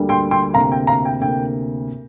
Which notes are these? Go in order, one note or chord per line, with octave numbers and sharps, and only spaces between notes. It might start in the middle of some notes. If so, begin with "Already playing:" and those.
Already playing: D2 D3 G3 A#3
G5 C6
G5 C6
D2 C3 A#3 F5 A#5
G5
F5 A#5
G5
D2 C3 A#3 G5